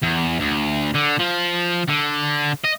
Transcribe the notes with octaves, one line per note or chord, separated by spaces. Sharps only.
E2
D2
D3
F3
D3
D#5